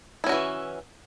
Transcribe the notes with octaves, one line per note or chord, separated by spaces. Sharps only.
E3 C#4 E4 F#4